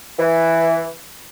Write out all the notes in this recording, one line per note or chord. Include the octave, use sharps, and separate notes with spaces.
E3